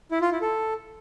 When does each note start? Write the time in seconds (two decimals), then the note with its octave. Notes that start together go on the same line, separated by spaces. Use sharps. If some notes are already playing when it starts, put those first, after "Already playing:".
0.12 E4
0.22 F4
0.32 E4
0.42 A4